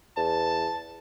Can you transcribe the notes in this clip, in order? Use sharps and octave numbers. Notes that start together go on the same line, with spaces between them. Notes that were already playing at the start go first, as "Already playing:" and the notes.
E2 A5